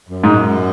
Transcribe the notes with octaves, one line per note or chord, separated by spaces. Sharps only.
F#2
G#2